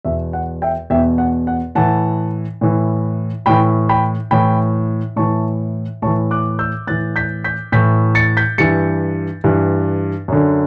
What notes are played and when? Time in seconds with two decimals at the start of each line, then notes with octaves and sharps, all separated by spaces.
0.05 E2 B2 E5
0.33 F#5
0.62 E5 G5
0.90 E2 B2 E5 G5
1.18 F#5
1.47 F#5
1.75 A2 E3 F#5 A5
2.61 A2 E3
3.46 A2 E3 G5 B5
3.89 G5 B5
4.31 A2 E3 G5 B5
5.16 A2 E3 A5 C#6
6.02 A2 A5 C#6
6.07 E3
6.31 D6 F#6
6.59 E6 G6
6.87 A2 E3 F#6 A6
7.16 G6 B6
7.44 G6 B6
7.72 A2 E3 G6 B6
8.15 A6 C#7
8.37 G6 B6
8.58 G2 E3 A6 C#7
9.44 G2 E3
10.28 F#2 D3